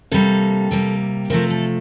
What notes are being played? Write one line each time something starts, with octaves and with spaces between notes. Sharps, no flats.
C3 G3 A#3 A4
C3 G3 A#3
C3 F3 A3 A#4
A4